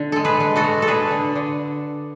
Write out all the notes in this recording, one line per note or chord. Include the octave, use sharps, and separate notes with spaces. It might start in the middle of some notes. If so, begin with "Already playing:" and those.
Already playing: D3
G#3 A4
G#4 B4
G#3
F#4 A4
G#3
A4
D3 G#4 B4
D3
D3